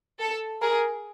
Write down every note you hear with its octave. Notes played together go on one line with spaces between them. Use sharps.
A4
G#4 A#4